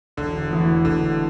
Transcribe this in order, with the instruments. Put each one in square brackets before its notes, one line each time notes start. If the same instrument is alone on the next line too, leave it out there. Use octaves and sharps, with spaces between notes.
[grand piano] E1 [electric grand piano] D3
[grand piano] E2 E3 A3 E4
[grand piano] E1 [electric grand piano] D3